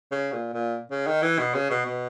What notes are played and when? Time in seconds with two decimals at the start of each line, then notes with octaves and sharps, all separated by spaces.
0.12 C#3
0.33 A#2
0.54 A#2
0.91 C#3
1.07 D#3
1.22 E3
1.38 B2
1.54 C#3
1.70 B2
1.86 B2